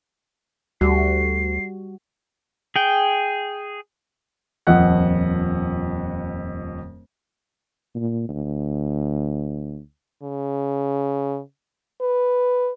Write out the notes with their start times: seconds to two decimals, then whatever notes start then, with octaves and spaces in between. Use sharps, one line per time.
0.81 D2 G3 F#4 C7
2.76 G#4 G5
4.67 D#1 F2 F3 D#5 F#5 F#6
7.95 A#2
8.28 D2
10.23 C#3
12.01 B4